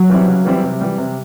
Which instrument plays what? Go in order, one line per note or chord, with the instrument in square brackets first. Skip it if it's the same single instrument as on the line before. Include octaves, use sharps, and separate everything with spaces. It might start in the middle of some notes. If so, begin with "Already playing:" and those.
Already playing: [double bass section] F#3
[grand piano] E3 G3 C4 E4
C#3
E3 G3 C4 E4
C3
E3 G3
C3